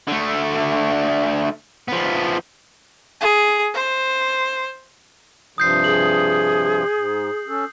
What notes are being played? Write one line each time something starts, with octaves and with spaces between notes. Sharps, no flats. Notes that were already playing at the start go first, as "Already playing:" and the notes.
D3 A3
F3 B3
G#4
C5
G2 C3 F3 D#6 G6 C7
G#4 F#7
G#2
C#4 A4